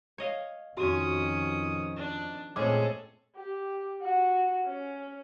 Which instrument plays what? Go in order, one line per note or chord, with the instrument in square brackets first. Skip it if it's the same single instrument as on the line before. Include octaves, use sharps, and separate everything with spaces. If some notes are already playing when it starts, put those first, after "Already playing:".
[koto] C#5 D#5 F5
[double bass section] F2 D#3 [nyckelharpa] C#4 D#6 [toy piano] F#4
[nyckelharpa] D4
[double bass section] A#2 A3 C4 [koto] G#3 C#4 [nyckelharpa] G#4 A4 [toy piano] D6
[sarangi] G4
F#4
C#4